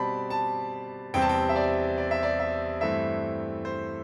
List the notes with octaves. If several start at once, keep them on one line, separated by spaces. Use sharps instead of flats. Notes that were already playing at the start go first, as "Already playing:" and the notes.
Already playing: B2 G3 C4 D5 A5 B5
A5
E2 C3 G3 C4 G5
A5
G5
E5
D5
D5
E5
D5
E5
G2 E3 A3 C4 E5
C5